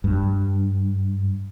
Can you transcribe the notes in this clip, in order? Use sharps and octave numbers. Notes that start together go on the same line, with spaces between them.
G2